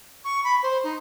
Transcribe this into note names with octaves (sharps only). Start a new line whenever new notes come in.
C#6
B5
C5
D#4